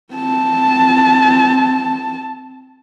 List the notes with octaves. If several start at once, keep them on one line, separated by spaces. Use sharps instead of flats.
C4 A5